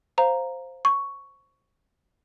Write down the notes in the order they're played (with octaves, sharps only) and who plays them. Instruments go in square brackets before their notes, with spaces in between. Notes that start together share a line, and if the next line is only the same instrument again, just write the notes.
[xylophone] C5 F5 A#5
C#6